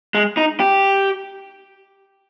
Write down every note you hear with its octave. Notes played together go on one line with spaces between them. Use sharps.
G#3
D#4
G4